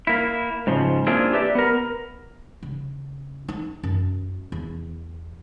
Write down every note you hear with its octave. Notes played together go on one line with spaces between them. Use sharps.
A#3 E4
G#2 C#3 F3
A#3 C4 D4 E4 F4 G#4
G4 B4 D5 E5
B3 A#4
C#3
D#4
F#2
E2